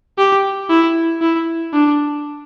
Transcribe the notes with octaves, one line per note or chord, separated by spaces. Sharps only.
G4
E4
E4
D4